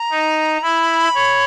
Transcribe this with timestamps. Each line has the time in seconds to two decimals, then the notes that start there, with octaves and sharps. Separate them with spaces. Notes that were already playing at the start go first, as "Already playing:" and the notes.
Already playing: A#5
0.11 D#4
0.63 E4 B5
1.15 C#5